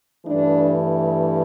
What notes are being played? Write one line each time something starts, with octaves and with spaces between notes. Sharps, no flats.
G2 E3 A3 D4